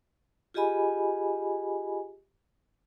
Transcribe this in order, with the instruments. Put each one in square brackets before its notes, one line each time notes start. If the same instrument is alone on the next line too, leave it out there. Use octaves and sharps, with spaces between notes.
[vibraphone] F4 G4 G#4 D#5 G#5 B5